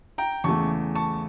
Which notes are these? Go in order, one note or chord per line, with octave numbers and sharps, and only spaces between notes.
G5 A#5
E2 C#3 E3 A3 A5 C#6
A5 C#6